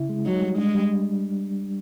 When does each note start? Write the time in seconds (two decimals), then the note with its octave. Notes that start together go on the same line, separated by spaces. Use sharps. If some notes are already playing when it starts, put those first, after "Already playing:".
Already playing: C#3 E4
0.09 G#3
0.26 F#3 D#4
0.42 G3
0.58 G#3 D4
0.75 G3